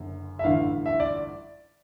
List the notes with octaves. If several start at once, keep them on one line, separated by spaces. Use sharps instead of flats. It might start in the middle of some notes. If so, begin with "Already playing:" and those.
Already playing: F#1 F#2 D3
E5
A1 G2 D3 F5
E5
D5